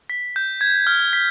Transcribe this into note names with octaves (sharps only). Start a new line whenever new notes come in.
B6
G6
G#6
F6
B6